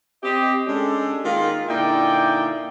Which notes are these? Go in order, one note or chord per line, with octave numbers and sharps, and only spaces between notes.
C4 G4 D#5
G#3 C#4 D4 G4 A4
D#3 G#3 A#3 F4
A#2 D3 D#4 E4 D5 G5